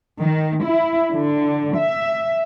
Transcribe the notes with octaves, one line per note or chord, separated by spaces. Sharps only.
D#3
E4
D3
E5